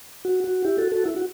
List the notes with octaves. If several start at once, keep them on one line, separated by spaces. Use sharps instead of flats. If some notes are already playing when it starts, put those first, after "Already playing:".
F#4
F#4
E4 G4
F#4 A4
F#4 A4
E4
F#4